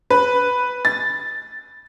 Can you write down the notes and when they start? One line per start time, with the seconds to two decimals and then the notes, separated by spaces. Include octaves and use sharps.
0.10 B4
0.85 A6